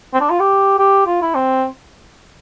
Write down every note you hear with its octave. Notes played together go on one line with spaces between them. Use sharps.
C4
D4
F4
G4
G4
F4
E4
C4